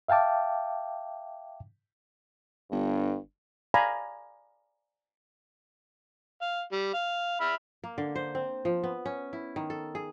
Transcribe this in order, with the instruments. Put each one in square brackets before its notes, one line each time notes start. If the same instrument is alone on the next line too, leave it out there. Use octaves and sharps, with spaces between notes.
[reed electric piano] E5 F5 G5 A5 D6
[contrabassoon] G1 [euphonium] G2
[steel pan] D5 F5 G#5 A#5 B5
[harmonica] F5
G3
F5
E5 B5 F6
[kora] A#3
D3
C5
C4
F3
B3
C#4
E4
D#3
A4
G#4